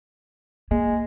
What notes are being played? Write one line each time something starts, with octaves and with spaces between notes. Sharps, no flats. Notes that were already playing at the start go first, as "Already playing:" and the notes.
G#3 A#3